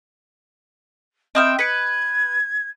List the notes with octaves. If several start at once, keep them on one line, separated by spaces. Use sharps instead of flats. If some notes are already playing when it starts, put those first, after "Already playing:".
C4 D#5 E5 G5 B5 D#6 F6
B4 G#6 B6 C#7 D7